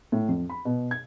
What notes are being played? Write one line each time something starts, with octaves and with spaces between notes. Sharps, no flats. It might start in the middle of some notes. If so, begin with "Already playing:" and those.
A2
F2
B5
B2
G#6